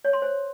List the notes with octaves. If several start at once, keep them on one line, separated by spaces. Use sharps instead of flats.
C#5
C6
C5